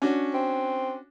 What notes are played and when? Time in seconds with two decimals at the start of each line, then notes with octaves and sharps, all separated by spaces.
0.02 C#4 D4 F#4
0.34 C4